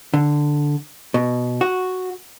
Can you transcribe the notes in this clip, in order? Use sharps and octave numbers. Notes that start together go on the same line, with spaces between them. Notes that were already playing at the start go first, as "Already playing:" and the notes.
D3
B2
F#4